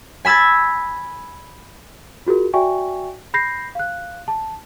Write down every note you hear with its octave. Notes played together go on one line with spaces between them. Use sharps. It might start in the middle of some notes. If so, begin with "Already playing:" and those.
G#5 B5 E6 G#6 A6
F4 F#4 G#4 A#4
F#4 D5 E5 G5 G#5 C#6
B5 G6 A#6 C7
F5 F#6
A5